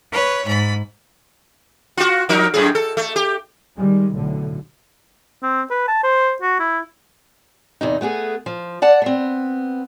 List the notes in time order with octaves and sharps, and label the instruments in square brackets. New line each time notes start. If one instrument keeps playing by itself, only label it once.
[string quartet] B4 C#5
G#2 B5
[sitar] F4 F#4
F3 D#4 A#4
F#2 A2 G#4
A4
A3
G4
[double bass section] D#3 G3 G#3
B1 A2 D3
[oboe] C4
B4
A5
C5
F#4
E4
[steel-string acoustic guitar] E2 C3 D#4
A3 B3 G4 G#4
F3
D5 F#5 A5
B3 C4